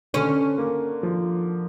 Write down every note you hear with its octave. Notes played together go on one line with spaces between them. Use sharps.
D3 C#4
A#3
F3